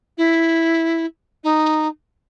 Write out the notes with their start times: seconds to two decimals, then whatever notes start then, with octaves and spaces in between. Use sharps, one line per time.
0.17 E4
1.44 D#4